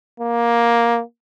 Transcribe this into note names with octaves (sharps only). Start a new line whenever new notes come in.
A#3